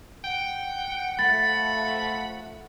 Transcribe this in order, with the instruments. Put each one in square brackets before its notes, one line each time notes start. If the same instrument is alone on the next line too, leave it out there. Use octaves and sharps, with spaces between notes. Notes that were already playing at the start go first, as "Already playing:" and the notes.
[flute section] F#5 [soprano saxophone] G5
[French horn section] F3 A3 [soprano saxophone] B5 [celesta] A6